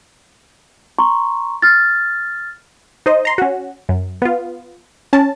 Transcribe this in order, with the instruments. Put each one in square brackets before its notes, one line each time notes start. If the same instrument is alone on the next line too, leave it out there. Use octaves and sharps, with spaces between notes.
[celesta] A#5 C6 C#6
F6 A6
[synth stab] D#4 C5 D#5
A#5 C6
C#4 F#4
F#2
B3 F4
C#4 A5